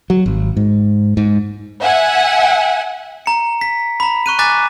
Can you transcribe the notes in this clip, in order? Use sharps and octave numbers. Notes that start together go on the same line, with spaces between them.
F#3
G#1
G#2
G#2
E5 F#5 G#5
A#5 C#7
B6
A#5 B5
C#6 F#6 D#7
G#5 A#5 D6 F#6 A6 B6